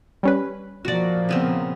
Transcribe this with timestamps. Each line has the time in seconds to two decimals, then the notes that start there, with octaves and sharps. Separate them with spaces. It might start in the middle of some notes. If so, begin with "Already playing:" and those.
0.23 G3 C#4 B4
0.85 A#2 F3 A#3 F#4 D5
1.29 C#3 B3 C4